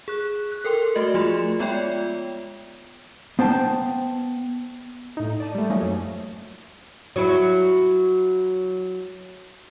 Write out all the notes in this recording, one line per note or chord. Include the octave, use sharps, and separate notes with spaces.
G#4 F#6
F#6
A4 A#4 G5 C6 D6
A3 F#4 D#5
F3 A3 F4 G#4 B5 C6
G#3 B3 F4 C#5 D5 G5
B3 C5 G5 A5
A2 D#4
D5 A5 D#7
G3 A3
F3 F#3 A3 A#3 C#4 D#4
F#2
F#3 E4